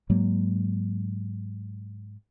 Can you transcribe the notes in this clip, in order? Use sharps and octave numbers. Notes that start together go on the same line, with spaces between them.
G#2 F#3 G#3 A#3